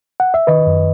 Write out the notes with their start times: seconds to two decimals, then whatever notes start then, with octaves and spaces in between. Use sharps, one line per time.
0.20 F#5
0.34 E5
0.47 D#3 B4 D#5
0.67 F#2